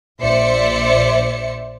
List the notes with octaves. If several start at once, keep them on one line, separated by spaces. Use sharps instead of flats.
A#1 C5 D5 E5 C#7